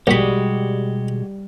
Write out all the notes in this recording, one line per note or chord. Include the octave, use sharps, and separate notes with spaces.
A#1 B2 G3 G#3 F#4 G4 B5